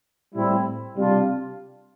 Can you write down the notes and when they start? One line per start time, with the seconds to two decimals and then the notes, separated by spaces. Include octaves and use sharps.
0.35 A2 G3 C4 E4
0.96 C3 G3 D4 F4